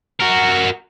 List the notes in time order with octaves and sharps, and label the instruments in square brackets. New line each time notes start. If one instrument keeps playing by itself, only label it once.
[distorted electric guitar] F#4 A#4